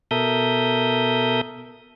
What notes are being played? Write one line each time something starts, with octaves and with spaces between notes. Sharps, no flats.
B2 A4 A#4 E5 D#6 G6